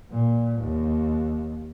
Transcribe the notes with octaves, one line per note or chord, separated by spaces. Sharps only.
A#2
D#2